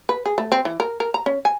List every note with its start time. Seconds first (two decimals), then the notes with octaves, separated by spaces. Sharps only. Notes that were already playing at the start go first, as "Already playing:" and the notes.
0.09 B4
0.26 G#4
0.38 A3
0.52 C4
0.65 E3
0.80 A#4
1.00 A#4
1.14 A#5
1.26 C#4
1.45 G#5